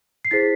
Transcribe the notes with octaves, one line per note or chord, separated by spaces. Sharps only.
C7
E4 G#4 C5 A6 B6